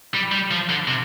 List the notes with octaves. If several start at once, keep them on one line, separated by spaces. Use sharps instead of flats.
G3
G3
F3
D3
C3